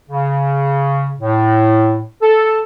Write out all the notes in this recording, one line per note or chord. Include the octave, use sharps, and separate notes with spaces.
C#3
A2
A4